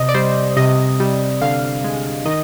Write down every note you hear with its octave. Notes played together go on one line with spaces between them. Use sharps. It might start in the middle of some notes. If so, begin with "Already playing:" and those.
Already playing: C3 D#5
D5
G3 C5
C3 D#5
G3
D3 F5
G#3
D#3 D#5